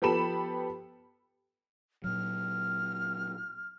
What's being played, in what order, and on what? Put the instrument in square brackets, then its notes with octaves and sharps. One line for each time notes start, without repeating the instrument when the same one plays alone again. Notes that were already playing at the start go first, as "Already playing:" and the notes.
[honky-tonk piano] F3 B3 G4 A4 B5 E7
[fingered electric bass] A#2 F#3 [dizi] F6